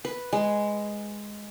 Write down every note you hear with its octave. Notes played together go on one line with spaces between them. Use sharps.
B4
G#3